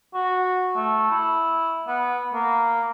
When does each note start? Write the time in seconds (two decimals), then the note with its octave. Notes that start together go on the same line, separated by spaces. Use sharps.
0.14 F#4
0.76 A3
1.11 E4
1.88 B3
2.34 A#3